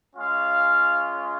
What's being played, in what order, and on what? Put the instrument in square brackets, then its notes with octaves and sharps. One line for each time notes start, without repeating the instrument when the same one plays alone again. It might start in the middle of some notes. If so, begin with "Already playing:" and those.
[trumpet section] G#3 C#4 F4 F5